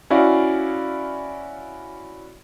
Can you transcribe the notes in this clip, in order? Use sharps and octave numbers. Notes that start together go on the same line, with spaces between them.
C#4 E4 F#4 D5 F5